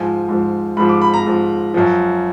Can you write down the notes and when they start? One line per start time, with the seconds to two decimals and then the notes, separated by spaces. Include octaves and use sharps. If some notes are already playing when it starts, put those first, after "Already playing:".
Already playing: G#2 F3 G#5
0.28 G#2 F3
0.77 G#2 F3 B5
0.89 D6
1.01 B5
1.13 A#5
1.26 G#2 F3
1.74 F#2 F3